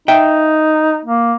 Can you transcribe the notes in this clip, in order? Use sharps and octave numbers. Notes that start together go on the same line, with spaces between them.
D#4 E5 G5
A#3